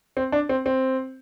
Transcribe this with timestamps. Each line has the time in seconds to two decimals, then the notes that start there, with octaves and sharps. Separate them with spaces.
0.17 C4
0.32 D4
0.49 C4
0.66 C4